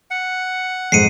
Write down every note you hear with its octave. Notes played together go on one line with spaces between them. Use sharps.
F#5
F2 G#2 C7 C#7 D#7